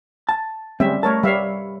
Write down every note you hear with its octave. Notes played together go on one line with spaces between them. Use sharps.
A5
D2 G3 G#3 C4 C#4 E5
A3 A#4 C#5 A5
G3 B4 C#5 E5 F5